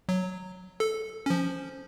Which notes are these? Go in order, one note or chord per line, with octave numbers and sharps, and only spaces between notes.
F#3
A4
F3 C#4